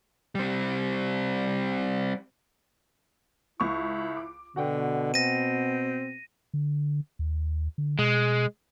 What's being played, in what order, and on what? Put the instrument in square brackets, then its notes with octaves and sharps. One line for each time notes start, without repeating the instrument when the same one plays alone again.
[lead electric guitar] G3 C4
[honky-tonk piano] C#2 C#6 [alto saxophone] E4
[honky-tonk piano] D6
[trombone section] B2 [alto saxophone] D3 [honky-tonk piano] F#4 F#5 G5
[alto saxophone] C4 [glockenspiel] A#6 D#7
[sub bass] D3
D#2
D3
[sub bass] B2 [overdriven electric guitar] G#3